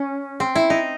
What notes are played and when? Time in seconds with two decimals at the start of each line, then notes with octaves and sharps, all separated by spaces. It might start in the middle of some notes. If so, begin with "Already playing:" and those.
Already playing: C#4
0.40 C4
0.55 E4
0.70 D#4